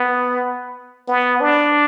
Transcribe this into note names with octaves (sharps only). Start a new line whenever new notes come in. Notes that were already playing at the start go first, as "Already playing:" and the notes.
Already playing: B3
B3
D4